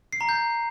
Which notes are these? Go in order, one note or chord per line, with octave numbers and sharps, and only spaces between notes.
C7
A#5
G6